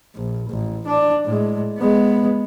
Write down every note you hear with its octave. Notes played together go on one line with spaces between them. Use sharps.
A#1
A1
D4
A2 G#3
G#3 B3